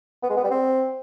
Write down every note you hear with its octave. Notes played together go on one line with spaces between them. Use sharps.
B3
G#3
B3
G3
C4